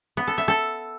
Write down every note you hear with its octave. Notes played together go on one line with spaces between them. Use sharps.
B3
A4
E5
A4